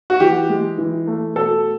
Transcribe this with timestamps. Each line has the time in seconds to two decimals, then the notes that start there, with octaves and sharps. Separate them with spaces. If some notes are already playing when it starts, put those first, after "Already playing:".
0.10 F#4
0.20 E3 G4
0.49 G#3
0.78 E3
1.07 A3
1.36 B2 A4